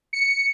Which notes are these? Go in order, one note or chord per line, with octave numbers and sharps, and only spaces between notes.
C#7